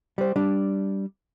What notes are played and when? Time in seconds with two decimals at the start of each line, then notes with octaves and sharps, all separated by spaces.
0.18 G3 C5
0.36 G3 D4